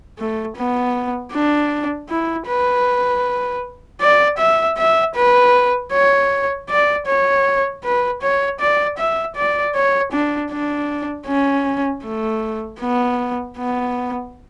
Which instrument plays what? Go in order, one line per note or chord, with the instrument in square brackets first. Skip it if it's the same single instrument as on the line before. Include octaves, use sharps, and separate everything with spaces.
[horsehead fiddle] A3
B3
D4
E4
B4
D5
E5
E5
B4
C#5
D5
C#5
B4
C#5
D5
E5
D5
C#5
D4
D4
C#4
A3
B3
B3